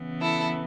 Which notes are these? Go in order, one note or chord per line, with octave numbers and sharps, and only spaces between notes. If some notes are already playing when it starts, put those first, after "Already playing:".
Already playing: C#3 E3 B3
E4 A4